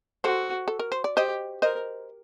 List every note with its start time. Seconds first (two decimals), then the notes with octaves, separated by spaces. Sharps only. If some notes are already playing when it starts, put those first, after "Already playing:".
0.24 F#4 A4 C5
0.68 A4
0.79 A#4
0.92 C5
1.04 D5
1.16 G4 C5 D#5
1.62 A#4 C5 D#5